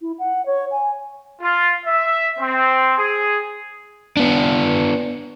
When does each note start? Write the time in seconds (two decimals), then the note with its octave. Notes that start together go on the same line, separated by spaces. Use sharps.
0.02 E4
0.19 F#5
0.46 C#5
0.71 G#5
1.42 F4
1.86 E5
2.38 C4
2.96 G#4
4.17 B3 D4